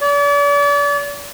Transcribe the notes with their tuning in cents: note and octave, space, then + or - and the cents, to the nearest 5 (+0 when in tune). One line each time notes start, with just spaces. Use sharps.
D5 -40